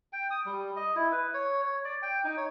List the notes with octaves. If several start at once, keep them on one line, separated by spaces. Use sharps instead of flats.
G5
D#6
G3
D#5
E4
B4
C#5
C#5
D5
G5
D#4
C#5